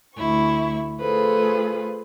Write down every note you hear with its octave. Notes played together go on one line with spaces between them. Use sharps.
D2 E4 C#6
A3 F4 G#4 A4 B4 C5